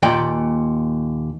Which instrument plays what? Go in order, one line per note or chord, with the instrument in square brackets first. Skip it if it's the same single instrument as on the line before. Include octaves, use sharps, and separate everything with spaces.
[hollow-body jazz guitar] D#2 A#2 G5